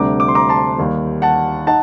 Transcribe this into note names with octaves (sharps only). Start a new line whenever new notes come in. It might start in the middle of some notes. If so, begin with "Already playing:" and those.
Already playing: D2 C3 G3 D4 A#5 D6
D6
C6
A#5 D6
A5 C6
D#2 D#3 G3
F#5 A5
D#4 F#5 A5